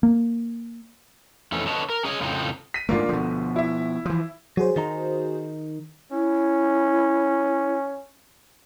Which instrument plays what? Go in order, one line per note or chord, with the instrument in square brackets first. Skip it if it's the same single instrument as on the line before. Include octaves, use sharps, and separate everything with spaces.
[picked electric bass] A#3
[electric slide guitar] F2 E3 A3 C#4 D#4
D3 B4 C#5 D#5 A5
A#4
C#4 G#4 C#5 D#5
F2 A2 C#3 F3 C4 D#4
[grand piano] B6 D#7
[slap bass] G#2 D#3 A3 [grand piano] A#3 D4 F4
[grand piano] D2 [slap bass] B2 F3
[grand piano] E4 E5
[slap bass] E3 F3
[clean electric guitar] F#3 [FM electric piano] F#4 G#4 C5
[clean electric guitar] D#3 D#4 A#5
[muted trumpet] C#4 [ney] E4